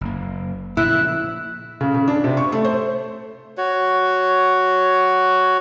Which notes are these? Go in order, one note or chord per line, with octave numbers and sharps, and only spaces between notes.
F#1 A#3
A#2 C#3 F3 E4 E5 F#6
C#3
C#3
D4
C3
C#6
A3
C5
F#4 C#5